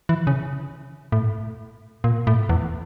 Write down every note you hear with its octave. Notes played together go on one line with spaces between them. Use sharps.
E3
C#3
A2
A#2
A2
E2